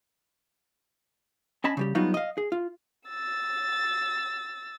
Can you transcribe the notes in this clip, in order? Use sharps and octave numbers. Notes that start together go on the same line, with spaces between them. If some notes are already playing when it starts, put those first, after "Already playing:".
C#4 D#5 G#5 A5 B5
C#3 G3 G4
F#3 G3 B3 D#4 F4 F#4
D#5 F5
G#4
F4
E6 A6